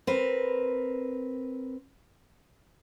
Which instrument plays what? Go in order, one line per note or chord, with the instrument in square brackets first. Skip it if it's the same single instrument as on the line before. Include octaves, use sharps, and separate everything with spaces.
[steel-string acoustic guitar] C4 A#4 B4